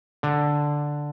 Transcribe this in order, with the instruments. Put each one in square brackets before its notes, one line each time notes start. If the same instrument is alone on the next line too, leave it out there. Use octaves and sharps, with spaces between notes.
[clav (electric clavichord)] D3